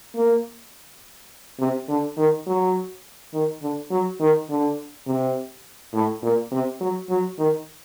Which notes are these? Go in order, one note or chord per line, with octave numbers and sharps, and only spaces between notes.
A#3
C3
D3
D#3
F#3
D#3
D3
F#3
D#3
D3
C3
A2
A#2
C3
F#3
F#3
D#3